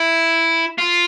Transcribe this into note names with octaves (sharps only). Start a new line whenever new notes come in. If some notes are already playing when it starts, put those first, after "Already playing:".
Already playing: E4
F4